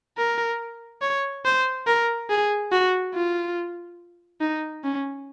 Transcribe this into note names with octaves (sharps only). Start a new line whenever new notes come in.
A#4
C#5
C5
A#4
G#4
F#4
F4
D#4
C#4